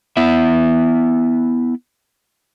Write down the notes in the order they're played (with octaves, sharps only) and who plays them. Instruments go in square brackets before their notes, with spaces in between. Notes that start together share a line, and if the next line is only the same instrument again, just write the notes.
[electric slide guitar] B3 E4 E5